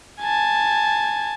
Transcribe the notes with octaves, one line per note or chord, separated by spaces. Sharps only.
G#5 A5